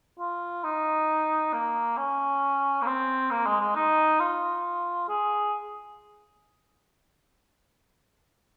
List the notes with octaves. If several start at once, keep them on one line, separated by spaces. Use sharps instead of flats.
F4
D#4
A#3
C#4
A#3
C4
A#3
G#3
G#3
D#4
F4
G#4